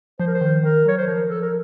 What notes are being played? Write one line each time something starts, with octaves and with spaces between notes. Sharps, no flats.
F3 C5
A#4
C5
D#3
D#3 A#4
F#3 C#5
C5
F3 A#4
A4
A#4